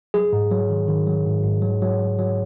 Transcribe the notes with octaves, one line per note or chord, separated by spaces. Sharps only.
F#3 G#4
G#2
F#3
D#3
D#3
F#3
G#2
G#2
F#3
F#3
F#3
F#3